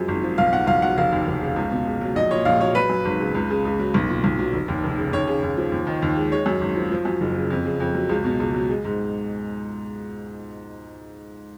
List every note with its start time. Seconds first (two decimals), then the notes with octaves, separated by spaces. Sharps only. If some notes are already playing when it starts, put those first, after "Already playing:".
Already playing: F#2 F3 G#3
0.08 G#1
0.23 F3
0.38 B1 F5
0.52 B2 F#5
0.67 B1 F5
0.82 F#3 F#5
0.97 F1 F5
1.12 D#2
1.27 F1
1.42 C#3
1.56 C#2
1.71 B2
1.87 C#2
2.01 F#3
2.15 A#1 D#5
2.31 A#2 C#5
2.45 A#1 F5
2.60 F#3 C#5
2.75 F#3 B4
2.90 F#2
3.05 G#1
3.20 C#3
3.35 C#2
3.50 C#3
3.65 C#2
3.79 F#3
3.94 B1
4.09 A#2
4.24 B1
4.39 F#3
4.53 F1
4.68 D#2
4.84 F1
4.98 C#3
5.13 D#2 C#5
5.27 C#3
5.43 D#2
5.57 F3
5.72 D#2
5.87 D#3
6.02 D#2
6.17 G#3
6.32 G#3 C#5
6.46 F#2
6.61 G#1
6.77 F3
6.91 F3
7.05 F#2
7.21 F#1
7.36 C#3
7.50 F2
7.65 C#3
7.80 F2
7.94 F#3
8.09 C#2
8.24 B2
8.40 C#2
8.54 F#3
8.69 G#3
8.85 G#2